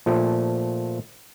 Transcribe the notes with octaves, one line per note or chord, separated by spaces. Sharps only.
A#2 F3 A3